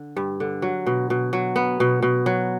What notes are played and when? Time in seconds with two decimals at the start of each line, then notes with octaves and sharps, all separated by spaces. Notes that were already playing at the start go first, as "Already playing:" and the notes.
Already playing: D3
0.16 G2
0.40 D3
0.62 F#3
0.86 B2
1.10 B2
1.33 F#3
1.56 B3
1.80 B2
2.02 B2
2.26 F#3